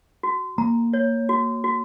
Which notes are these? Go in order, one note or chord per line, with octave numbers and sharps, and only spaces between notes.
F#4
A#3 A#5
C#5
F#4
F#4